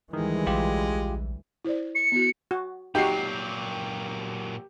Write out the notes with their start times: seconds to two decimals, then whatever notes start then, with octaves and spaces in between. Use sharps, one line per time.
0.13 D2 D#3 E3 G3 G#3
0.46 A#1 F4 G4
1.65 E4 C5 D5
1.95 C#7
2.12 B3 E4 F#4
2.51 F#4
2.95 A#2 F#3 D#4 F#4 G4 C7